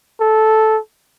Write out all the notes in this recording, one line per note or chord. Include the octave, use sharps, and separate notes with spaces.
A4